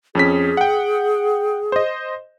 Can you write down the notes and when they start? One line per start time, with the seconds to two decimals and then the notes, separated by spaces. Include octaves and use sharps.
0.15 F2 C#4 G#4 B6
0.57 F#5 G5
1.72 C5 D#5